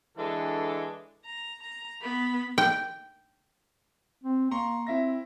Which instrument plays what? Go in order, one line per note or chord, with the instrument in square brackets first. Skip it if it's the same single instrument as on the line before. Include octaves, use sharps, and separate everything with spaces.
[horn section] D3 E3 G#3 D4 E4 A4
[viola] A#5
A#5
B3 B5
[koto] G5
[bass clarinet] C4
[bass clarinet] A#3 [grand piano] A#5 C6 C#6
[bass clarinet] C4 [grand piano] E4 E5 A#6